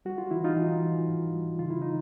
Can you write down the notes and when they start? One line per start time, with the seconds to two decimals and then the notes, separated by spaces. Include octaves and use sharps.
0.05 G3 F#4
0.18 F4
0.31 E3 E4
0.44 D#4 F4
0.56 E3
0.82 E3
1.08 G#2
1.33 G3
1.59 C#3 F4
1.70 E4
1.81 E3 D#4